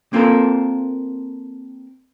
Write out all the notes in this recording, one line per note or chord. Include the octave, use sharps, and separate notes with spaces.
A#3 C4 F4 A4 A#4